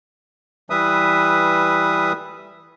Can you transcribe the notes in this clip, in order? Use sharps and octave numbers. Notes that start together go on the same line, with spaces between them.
E3 G3 B4 E5 D#6